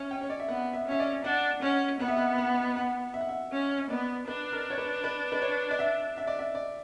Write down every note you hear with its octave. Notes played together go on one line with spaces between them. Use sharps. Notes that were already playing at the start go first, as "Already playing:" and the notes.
Already playing: C#4 E5
G5
C#5
D5
E5
B3 F#5
E5
C#4 E5
D5
D4 F#5
C#4 F#5
B3 F#5
E5
F#5
F#5
F#5
E5
F#5
E5
C#4
B3 D5
D4 B4
A#4
C#5
B4
B4
B4
C#5
D5
E5
E5
D5
E5
D5